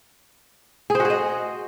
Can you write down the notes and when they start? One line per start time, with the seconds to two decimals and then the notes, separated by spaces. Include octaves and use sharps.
0.90 G#4
0.95 C5
1.00 F#4
1.05 G#4
1.10 D#5